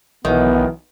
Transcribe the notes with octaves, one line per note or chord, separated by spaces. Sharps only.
B1 D#3 E3 B3